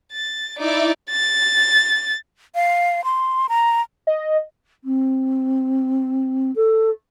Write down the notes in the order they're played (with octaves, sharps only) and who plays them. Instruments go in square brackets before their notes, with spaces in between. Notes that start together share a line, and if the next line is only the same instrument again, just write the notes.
[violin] A6
[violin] D#4 D5 [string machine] E4 E5 D6
[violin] A6
[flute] F5
C6
A#5
[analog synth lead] D#5
[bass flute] C4
A4